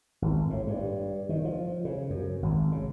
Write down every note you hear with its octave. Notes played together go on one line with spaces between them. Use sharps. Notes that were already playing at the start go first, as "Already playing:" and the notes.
G#1
A2
G2
D#3
F3
C#3
F#2
G#1
C#3